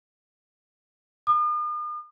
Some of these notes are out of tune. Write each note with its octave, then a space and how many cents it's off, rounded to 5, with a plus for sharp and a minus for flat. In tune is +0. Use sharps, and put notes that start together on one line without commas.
D#6 -45